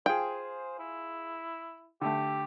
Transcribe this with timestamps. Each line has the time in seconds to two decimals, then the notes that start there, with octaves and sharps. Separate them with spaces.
0.06 F4 G#4 C5 G5
0.79 E4
2.01 D3 A3 G4